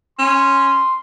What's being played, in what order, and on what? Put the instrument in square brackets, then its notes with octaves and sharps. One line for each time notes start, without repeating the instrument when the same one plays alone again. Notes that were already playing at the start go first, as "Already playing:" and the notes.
[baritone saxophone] C#4 [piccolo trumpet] C6